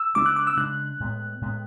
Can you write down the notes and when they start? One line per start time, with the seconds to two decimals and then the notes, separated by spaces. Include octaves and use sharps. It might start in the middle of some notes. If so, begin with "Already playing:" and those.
Already playing: E6
0.15 C#3 G#3 B3 D4 D6
0.26 F#6
0.36 D6
0.47 E6
0.57 C#3 G#3 D4 F#6
1.00 A2 G#3 B3
1.41 A2 G#3 B3